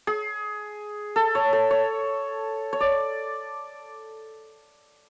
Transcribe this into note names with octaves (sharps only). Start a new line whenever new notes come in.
G#4
A4
C#5
A4
C#5
C#5
D5